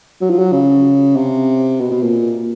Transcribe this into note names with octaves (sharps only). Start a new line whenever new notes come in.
F#3
F3
F#3
C#3
C3
B2
B2
A#2